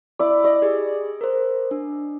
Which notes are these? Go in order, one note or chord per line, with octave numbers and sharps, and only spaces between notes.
E4 D5
D5 D#5
G4 G#4
A#4 C5
D4